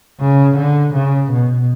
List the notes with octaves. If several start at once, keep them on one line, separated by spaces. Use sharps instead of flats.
C#3
D3
C#3
B2